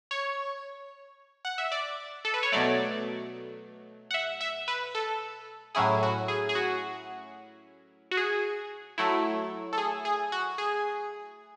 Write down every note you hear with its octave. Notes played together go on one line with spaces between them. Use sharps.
C#5
F#5
E5
D5
A4
B4
C#5
B2 F#3 A3 D5
F#5
E5
E5
B4
A4
A2 F#3 C#4 E4 G#4
F#4
G#4
G#4
F#4
F#4
G#4
F#3 A3 E4
A4
G#4
G#4
F#4
G#4